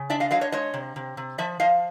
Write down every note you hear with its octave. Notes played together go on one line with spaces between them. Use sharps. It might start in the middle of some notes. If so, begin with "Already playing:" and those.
Already playing: C#3
D4 D5 E5
D#5 F5
F#3 D#5 F5
C#5 D#5
G#3 C#5 D#5
C3
C3
C3
F3 D5 E5
F3 D#5 F5